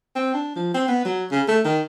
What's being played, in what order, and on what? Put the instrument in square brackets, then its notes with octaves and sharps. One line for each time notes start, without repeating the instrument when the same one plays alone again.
[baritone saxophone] C4
D4
F3
C4
B3
F#3
C#3
A3
D#3